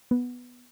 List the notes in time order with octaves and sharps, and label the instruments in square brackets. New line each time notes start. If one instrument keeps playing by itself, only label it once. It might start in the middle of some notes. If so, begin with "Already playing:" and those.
[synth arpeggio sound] B3